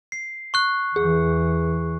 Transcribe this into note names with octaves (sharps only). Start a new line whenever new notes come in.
C7
C#6 F#6
E2 E3 G#4